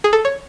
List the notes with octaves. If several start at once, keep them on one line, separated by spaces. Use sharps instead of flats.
G#4
A4
C#5